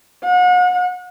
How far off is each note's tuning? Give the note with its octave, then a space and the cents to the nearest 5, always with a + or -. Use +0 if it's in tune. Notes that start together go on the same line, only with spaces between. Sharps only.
F#5 -40